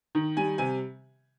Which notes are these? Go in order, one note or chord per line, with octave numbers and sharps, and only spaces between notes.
D#3
G3 G#5
C3 G#5